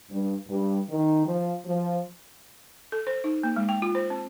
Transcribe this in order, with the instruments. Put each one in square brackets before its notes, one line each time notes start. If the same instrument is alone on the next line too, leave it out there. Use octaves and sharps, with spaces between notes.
[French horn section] G2
G2
D#3
F3
F3
[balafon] A4
C5
D#4
A#3
G#3
G5
F4
C5
C4